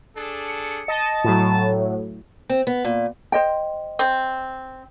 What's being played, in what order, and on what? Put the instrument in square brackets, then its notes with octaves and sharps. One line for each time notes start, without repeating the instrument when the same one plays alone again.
[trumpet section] D4 G#4 A4
[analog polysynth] C#7
[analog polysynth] D#5 [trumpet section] A5
[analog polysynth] A2 F#3
[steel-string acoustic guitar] C4
B3
A#2
[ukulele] C5 D#5 G5
[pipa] C4